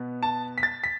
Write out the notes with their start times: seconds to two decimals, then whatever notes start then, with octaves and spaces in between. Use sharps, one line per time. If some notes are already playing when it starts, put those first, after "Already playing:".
Already playing: B2 B3
0.23 A5
0.58 B6
0.63 A6
0.84 B6